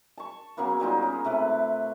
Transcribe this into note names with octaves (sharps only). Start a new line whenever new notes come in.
A5 C#6
C#3 F#3 A#3 B3
G3 G#3 D#4 F4
C#4
C3 A3 B4 D6